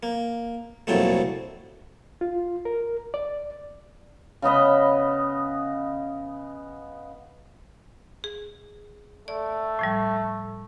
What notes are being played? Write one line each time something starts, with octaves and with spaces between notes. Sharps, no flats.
A#3
C2 F2 A#2 F#3 A3
F4
A#4
D5
C#3 B3 D#5 B5
G#4
A3 D5
A2 F3 G3